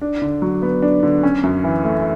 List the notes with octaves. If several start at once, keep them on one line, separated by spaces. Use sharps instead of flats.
D4
D3
F#3
B3
D4
D3
C#4
F#2
E3
A3